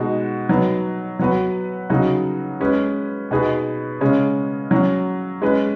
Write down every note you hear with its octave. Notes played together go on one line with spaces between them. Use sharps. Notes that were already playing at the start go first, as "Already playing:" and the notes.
Already playing: B2 G#3 D#4 F#4
F#3 B3 D#4
F#3 B3 F#4 B4
C#3 F#3 D#4 F#4
G#3 C#4 G#4 B4
B2 B3 D#4 G#4 B4
C#3 G#3 C#4
F#3 C#4 F#4
G#3 C#4 B4